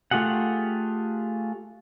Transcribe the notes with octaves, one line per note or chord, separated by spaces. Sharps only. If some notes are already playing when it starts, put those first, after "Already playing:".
A3 F4 G4 G#4 F#5